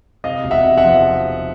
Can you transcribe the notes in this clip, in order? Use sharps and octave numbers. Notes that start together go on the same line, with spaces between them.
C3 D#5 F5
E1
E5 F#5
C3
E5 F#5
F3